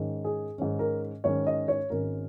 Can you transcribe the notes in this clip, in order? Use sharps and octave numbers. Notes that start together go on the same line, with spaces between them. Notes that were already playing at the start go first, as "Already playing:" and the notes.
Already playing: G#2 D#3 C#4
G#4
G#2 D#3 C#4
A#4
G#2 D#3 C#4 C#5
D#5
C#5
G#1 G#2 G#3 C#4 A#4